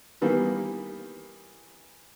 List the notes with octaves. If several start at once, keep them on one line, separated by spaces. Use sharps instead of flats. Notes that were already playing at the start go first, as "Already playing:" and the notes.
D#3 E3 G3 A#3 B3